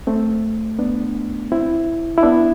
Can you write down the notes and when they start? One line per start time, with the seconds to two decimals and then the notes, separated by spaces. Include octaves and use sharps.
0.07 A3 C4
0.79 B3 D4
1.52 C4 E4
2.18 E4
2.23 B3 D4